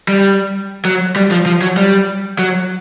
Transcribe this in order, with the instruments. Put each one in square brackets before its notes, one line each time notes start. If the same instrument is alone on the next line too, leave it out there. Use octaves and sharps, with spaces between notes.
[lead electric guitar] G3
F#3
G3
F3
F3
F#3
G3
F#3